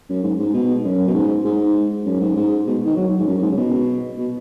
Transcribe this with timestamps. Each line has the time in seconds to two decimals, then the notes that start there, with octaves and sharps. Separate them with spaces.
0.09 F#2
0.23 G#2
0.39 G#2
0.54 B2
0.84 F#2
1.07 B2
1.14 G#2
1.45 G#2
2.06 F#2
2.20 G#2
2.36 G#2
2.67 B2
2.85 D#3
2.96 F#3
3.19 G#2
3.27 F#2
3.37 F#2
3.42 G#2
3.51 C#3
3.56 B2
4.18 B2